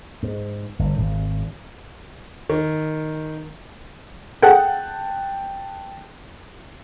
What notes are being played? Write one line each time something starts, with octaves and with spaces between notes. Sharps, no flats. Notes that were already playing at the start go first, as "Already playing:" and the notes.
G#2
G1
G#1
D#3
G#4 A4 F#5 G5 A5 F#6